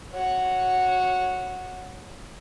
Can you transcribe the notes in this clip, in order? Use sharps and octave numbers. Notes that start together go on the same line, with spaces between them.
F#4 C#5